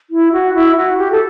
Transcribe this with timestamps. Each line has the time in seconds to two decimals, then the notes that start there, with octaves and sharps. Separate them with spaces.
0.10 E4
0.32 F#4
0.54 E4
0.76 F#4
0.98 G4
1.11 A4